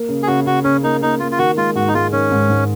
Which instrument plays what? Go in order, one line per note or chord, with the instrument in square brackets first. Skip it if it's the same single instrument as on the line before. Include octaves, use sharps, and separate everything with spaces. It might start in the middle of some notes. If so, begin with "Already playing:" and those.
Already playing: [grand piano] A#3
C#3
[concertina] G#4
[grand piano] C#3 [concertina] F#4
[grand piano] C#3 [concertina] F#4
[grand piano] C#3 [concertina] C#4
[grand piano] A#3 [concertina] D#4
[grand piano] A#3 [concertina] D#4
[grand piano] A#3 [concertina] F4
[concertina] F4
[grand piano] D#3 [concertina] F#4
[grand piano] G#3 [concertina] F4
[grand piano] G#2 [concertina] F#4
[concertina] D#4
[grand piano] G#3 [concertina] F4
[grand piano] D#3 [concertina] C#4
[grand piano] G#2
G#2